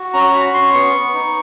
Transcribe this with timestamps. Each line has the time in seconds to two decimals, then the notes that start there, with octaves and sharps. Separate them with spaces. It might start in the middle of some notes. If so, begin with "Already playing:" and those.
Already playing: F#4
0.14 C#4 A#5
0.34 F#4 B5
0.54 C#4 C6
0.74 B3 C#6
0.94 B3
1.14 D#4